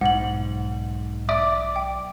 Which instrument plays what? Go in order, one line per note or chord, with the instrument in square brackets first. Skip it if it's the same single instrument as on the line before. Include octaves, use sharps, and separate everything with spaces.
[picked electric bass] B1 [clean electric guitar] G#2 [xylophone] F#5 F#7
[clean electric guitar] D5 [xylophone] E5
[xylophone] G5